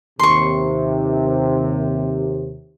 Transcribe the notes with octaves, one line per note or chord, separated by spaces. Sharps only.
D#2 C3 C6 C#6